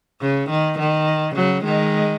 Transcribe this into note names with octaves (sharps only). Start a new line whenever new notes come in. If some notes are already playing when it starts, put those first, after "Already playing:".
C#3
D#3
D#3
C#3 F#3
D#3 G#3